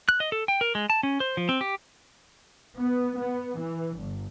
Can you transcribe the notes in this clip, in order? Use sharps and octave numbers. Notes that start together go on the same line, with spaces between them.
F#6
D#5
A4
G5
A#4
G#3
A5
C#4
C5
F3
C4
G4
B3
B3
E3
G1